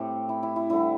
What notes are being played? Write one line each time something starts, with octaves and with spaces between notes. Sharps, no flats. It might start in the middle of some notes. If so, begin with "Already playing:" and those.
Already playing: A2 A3 C4 G4
E4
E4
E4
D3 G3 C4 E4